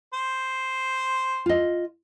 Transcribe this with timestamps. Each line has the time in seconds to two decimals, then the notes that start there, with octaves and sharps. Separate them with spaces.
0.14 C5
1.46 F4 D#5